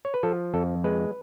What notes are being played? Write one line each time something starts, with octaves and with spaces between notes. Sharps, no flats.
C#5
B4
F3 A4
F2 A4
G#3 B4